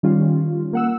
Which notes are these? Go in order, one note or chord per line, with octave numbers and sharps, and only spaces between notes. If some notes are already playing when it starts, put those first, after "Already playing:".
D#3 G3 C#4 F4
A#3 F#5 E6